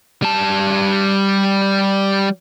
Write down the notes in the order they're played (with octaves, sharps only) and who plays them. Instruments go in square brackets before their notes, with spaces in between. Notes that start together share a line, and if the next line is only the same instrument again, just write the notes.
[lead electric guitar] G3 A5